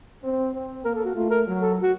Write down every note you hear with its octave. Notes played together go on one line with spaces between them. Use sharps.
C4
C4
A#3 A#4
A4
F#4
A3 F4
A#4
F#3
A4
F#4